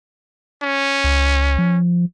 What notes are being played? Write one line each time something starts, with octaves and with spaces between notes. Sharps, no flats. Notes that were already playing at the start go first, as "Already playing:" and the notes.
C#4
C#2
F3